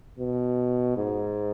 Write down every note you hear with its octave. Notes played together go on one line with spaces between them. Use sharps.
B2
G#2